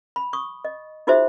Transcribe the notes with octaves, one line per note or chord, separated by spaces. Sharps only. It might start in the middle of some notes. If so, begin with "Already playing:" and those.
B5
C#6 D#6
D#5
D#4 F4 F#4 G#4 C5 E5